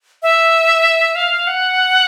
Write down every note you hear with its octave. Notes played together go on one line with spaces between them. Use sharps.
E5
F5
F#5